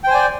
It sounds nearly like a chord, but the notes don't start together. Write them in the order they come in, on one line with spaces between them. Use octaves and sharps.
G5 C5 G#5 D5